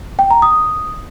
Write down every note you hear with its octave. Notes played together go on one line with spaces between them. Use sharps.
G5
A#5
D#6